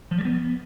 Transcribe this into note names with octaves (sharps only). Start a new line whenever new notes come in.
F3
G3
B3